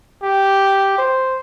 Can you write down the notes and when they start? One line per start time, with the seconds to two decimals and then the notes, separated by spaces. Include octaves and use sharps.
0.23 G4
0.98 C5